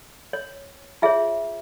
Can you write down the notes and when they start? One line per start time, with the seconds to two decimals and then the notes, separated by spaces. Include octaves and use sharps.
0.33 C#5
1.02 F4 G#4 C#5 E5